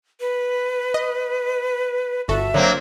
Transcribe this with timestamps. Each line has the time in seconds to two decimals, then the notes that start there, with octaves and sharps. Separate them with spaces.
0.20 B4
0.94 D#5
2.28 G1 F#4 A4 E5
2.54 D3 F#3 A#3 C4